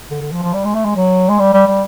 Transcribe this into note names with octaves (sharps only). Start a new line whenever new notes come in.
D3
D3
F3
F3
G3
G#3
A3
G#3
F#3
G#3
G3
G3
G3